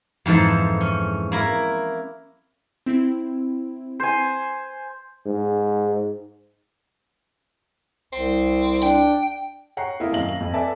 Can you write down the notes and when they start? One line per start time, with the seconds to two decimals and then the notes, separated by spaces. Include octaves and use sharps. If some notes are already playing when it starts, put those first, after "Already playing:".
0.26 F2 G#2 E3 A4 C5
0.81 C#4
1.32 A#3 E4 A#4
2.86 C4 E4
4.00 C5 G#5
5.26 G#2
8.13 C2 C4
8.83 D4 G5
9.77 C#5 F#5 G5 A#5 C7
10.00 A#3 E4 F4 A#4 D#5
10.12 D#1 F#2 A#3 F5 A#6 F#7
10.29 F#7
10.40 F2
10.54 A4 B4 D5 E5 G#5 A5